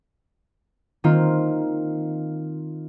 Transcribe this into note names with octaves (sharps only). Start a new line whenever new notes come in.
D#3 A#3 C4 F4